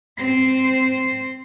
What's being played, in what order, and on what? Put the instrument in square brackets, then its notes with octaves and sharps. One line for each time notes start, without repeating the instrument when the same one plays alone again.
[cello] C4 C5